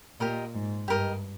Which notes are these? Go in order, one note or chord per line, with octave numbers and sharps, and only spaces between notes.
A#2 G4 A#4 D#5
G#2
G2 G4 A#4 D#5